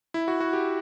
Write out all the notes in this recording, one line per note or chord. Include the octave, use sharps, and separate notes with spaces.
E4
F#4
F#4
G4